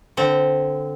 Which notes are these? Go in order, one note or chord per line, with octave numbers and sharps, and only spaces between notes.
D3 C4